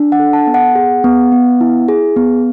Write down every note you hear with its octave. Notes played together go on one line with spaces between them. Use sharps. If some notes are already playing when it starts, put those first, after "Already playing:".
Already playing: D4
F#5
A4
A5
B3
F#5
G#4
B3
B3
E4
G#4
B3